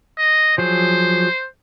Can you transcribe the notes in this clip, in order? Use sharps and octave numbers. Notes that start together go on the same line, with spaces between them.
D#5
F3 F#3 G#4 C5